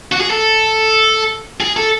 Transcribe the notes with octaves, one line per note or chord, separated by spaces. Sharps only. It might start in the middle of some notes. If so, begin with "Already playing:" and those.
F#4
G#4
A4
G#4
A4